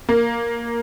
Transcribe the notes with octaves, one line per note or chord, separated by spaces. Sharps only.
A#3